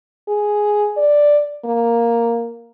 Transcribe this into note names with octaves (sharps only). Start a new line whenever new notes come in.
G#4
D5
A#3